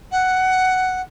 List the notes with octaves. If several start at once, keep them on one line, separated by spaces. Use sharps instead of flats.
F#5